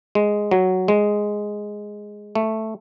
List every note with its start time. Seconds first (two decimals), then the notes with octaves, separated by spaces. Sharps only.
0.15 G#3
0.51 F#3
0.88 G#3
2.35 A3